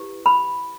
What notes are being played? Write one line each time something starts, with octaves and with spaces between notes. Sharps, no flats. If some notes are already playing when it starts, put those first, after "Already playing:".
Already playing: E4 G4 B4
B5